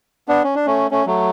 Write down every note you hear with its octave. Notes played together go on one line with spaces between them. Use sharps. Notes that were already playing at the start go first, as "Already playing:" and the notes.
B3 D4
C#4
D4
A3 C#4
A3 C#4
F#3 A3